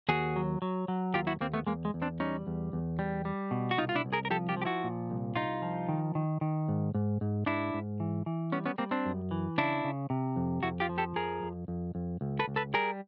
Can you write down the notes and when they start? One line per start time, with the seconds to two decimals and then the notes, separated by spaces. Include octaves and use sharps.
0.09 D#2 F#4 G#4
0.36 F#3
0.62 F#3
0.88 F#3
1.14 D#2 F4 G4
1.27 E4 F#4
1.40 D#2 A#3 C4
1.54 A3 B3
1.67 E2 G#3 A#3
1.85 G#3
1.94 E2
2.02 C4 D4
2.20 G3 C#4 D#4
2.47 E2
2.73 E2
2.99 G3
3.25 G3
3.51 B2
3.71 F#4
3.78 C2 D#4 F4
3.89 F4
3.95 D4 E4
4.05 C2
4.13 G#4 A#4
4.25 A#4
4.30 F3 G4 A4
4.49 F4 G4
4.56 F3
4.62 G4
4.65 E4 F#4
4.84 A#2
5.10 C2
5.36 C2 D#4 F4
5.62 F3
5.89 D#3
6.15 D#3
6.41 D#3
6.69 G#2
6.95 G#2
7.21 G#2
7.46 G#2 D4 E4
7.74 G#2
8.00 E3
8.26 E3
8.52 G3 B3 C#4
8.66 B3 C#4
8.78 G3 A#3 C4
8.91 C4 D4
9.05 F#2
9.31 E3
9.58 C#3 D4 E4
9.84 C#3
10.10 C3
10.36 F2
10.63 F2 E4 F#4
10.80 F4 G4
10.89 F3
10.98 G4 A4
11.16 F2 G#4 A#4
11.43 F2
11.68 F2
11.95 F2
12.21 C#2
12.39 A4 B4
12.48 C#2
12.56 A4 B4
12.74 G3 G#4 A#4